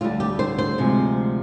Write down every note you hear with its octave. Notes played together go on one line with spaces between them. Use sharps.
D2 D3 G3 F4
G4
C5
C5
D2 C3 F3 G#3